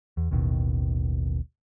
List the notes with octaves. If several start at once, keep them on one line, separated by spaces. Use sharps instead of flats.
E2
A1 D#2 B2 D#3